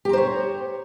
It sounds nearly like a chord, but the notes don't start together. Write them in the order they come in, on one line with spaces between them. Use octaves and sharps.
G4 A#5 C5 C#5